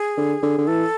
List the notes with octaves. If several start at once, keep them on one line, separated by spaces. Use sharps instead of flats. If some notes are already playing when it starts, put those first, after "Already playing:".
Already playing: G#4
D3
D3
D3
E3 A4